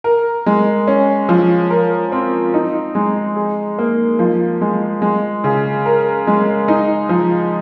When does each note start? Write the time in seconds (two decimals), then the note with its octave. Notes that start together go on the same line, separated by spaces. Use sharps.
0.04 A#4
0.46 G#3
0.87 C#4
1.29 F3
1.70 A#4
2.12 C4
2.54 D#4
2.95 G#3
3.36 G#4
3.78 A#3
4.19 F3
4.61 G#3
5.02 G#3
5.44 C#3
5.86 A#4
6.27 G#3
6.68 D#4
7.09 F3